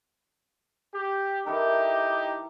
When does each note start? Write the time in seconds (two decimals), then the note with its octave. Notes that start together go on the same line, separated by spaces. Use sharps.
0.93 G4
1.46 E3 D#4 G4 A4 A#4